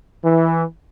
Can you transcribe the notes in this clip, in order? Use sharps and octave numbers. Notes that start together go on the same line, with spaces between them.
E3